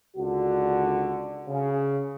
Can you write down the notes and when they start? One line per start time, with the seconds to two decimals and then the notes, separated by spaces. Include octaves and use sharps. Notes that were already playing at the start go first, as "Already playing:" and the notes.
0.17 C#2 D3 F#4
1.48 C#3